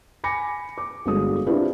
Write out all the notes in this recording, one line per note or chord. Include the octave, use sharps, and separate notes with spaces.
G#5 B5 D6 A#6 C#7
D6
G1 D3 G#3 F#4 G#4 D#6
C4 D4 E4 F4 G4 B4